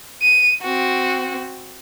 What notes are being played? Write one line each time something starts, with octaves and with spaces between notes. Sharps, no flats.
D#7
C4 F#4